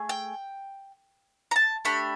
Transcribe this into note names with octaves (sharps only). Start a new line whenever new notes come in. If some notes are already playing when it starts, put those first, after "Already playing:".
Already playing: A3 G#4
G5
A#5
A5
A3 D4 G4 B5